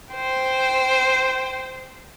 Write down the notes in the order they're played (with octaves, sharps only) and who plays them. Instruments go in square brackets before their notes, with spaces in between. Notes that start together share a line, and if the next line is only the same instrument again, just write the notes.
[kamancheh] C5 G5